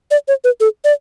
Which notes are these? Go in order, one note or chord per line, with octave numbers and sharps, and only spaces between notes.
D5
C#5
B4
A4
D5